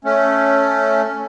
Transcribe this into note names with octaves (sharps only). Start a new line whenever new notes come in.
A3 C#4